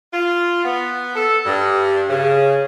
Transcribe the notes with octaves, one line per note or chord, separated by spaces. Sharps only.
F4
B3
A4
G2
C#3